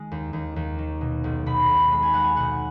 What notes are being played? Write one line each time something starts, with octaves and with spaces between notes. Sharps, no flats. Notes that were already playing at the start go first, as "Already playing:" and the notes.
Already playing: D#3 G#3
D#2
D#2
D#2
D#3
B2
B1
B1 B5
B1
G#3 B5
G#5
G#3 F#5
G#5
B1 F#5